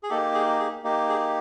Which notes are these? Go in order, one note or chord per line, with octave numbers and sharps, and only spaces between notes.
G#4
A#3 D#4 G4 A4
G#4
G#4
A#3 D#4 G4
G#4